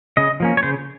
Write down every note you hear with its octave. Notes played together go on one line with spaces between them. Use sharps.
C#3 D#5
F3 A#3 C#4
C#5
C#3 C5